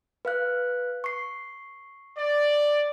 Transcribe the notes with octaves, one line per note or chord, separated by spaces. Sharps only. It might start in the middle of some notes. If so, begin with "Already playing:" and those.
B4 F5 F#6
C#6 C7
D5